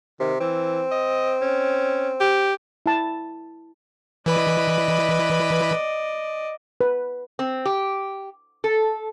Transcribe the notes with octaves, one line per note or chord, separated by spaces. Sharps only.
C3 D#3
E3 C4
D#5
C#4
G4
E4 A5
E3 B4 D5 D#5 B5
B4
C4
G4
A4